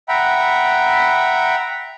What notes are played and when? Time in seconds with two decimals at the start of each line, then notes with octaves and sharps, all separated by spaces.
0.09 E5 F#5 G5 A#5 B5